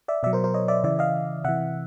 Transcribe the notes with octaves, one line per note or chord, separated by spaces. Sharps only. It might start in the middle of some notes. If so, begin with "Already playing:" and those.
D5 E5
B2 F#3 D5 E5
A#4 C5
A#4 C5
C#5 D#5
D5 E5
C#3 E3 D5 E5
D#5 F5
C3 E3 E5 F#5